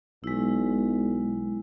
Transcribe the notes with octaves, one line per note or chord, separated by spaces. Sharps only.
B1 G#3 E4